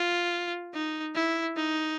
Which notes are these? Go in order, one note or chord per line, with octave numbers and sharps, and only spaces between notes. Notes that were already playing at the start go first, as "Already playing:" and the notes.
Already playing: F4
D#4
E4
D#4